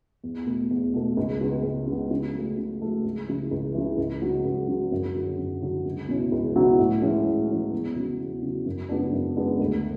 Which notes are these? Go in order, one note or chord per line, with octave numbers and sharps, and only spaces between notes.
E2
B2 A3
E2
B2 A3
C#2
C#3 G#3 B3
C#2
C#3 G#3 B3
C#3
F#3 A3
C#3
F#3 A3
C#2
C#3 E3
C#2
C#3 E3
C#2
C#3 F#3
C#2
C#3 F#3
F#2
D3 F#3
F#2
D3 F#3
C#2
B2 F#3 C#4 E4
C#2
B2 F#3 C#4 E4
A2
E3 G#3 C#4
A2
E3 G#3 C#4
E2
C#3 F#3
E2
C#3 F#3
F#2
C#3 G#3 B3 D4
F#2
C#3 G#3 B3 D4
D2